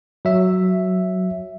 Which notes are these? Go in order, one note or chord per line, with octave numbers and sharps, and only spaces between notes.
F#3 E5